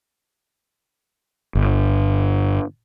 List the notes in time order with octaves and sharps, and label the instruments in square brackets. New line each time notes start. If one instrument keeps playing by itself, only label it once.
[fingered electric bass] G1